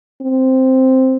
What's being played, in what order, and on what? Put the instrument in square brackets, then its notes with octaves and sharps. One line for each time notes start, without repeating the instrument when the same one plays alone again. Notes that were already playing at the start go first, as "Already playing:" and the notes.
[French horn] C4